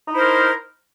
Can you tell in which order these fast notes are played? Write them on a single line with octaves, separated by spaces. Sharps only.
D#4 E4 C5 A#4